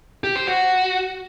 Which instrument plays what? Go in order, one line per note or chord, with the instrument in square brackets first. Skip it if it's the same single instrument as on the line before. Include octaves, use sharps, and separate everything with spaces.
[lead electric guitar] G4
C5
F#4